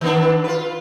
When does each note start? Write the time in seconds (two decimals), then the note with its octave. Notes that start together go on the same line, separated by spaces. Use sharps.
0.01 D#3 B3 D4
0.44 F4 B4